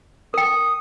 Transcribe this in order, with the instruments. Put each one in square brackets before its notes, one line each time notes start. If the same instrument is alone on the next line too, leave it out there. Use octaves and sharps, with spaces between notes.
[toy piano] A#4 G5 [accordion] D#6